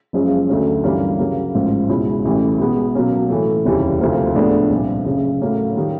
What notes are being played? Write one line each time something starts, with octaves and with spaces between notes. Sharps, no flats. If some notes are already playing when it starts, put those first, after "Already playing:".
F#1 F#2 C#3 F3 G#3
D2 D3 F#3 A3 C#4
G2 E3 G3 A#3 C#4
C#3 F#3 A#3
A1 G#2 F3
C#2 B2 G#3 C#4 E4
A1 A2 E3 G3
B2 G#3 B3
B2 F#3 A#3 C#4
A2 E3 A3
F1 D#2 C#3 E3 G3
D2 C3 F3 A#3
A2 F3 G#3 B3 D4
C2 A#2 F3
F#1 F#2 C#3
A2 F#3 A#3 C#4
D#3 G3 A#3